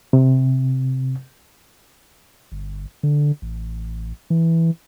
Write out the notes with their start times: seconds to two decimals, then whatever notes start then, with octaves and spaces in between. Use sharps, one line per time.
0.13 C3
2.52 G1
3.03 D3
3.42 A1
4.30 E3